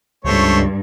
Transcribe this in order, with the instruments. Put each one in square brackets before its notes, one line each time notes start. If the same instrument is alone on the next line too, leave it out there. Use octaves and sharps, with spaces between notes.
[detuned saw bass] C#2 [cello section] G2 [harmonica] A3 C5 C#5